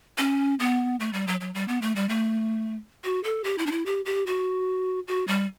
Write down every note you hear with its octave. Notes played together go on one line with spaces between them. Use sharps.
C#4
B3
A3
G3
F#3
F#3
G3
B3
A3
G3
A3
F#4
A4
G4
E4
D4
E4
G4
G4
F#4
F#4
G3